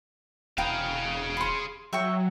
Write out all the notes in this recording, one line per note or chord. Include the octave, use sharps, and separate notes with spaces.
E1 G#4 B4 F5 G5 A#5
B5 C6
F#3 E5 G5 C#6